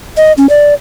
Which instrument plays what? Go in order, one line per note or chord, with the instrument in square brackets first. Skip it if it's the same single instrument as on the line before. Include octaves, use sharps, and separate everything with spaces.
[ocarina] D#5
C#4
D5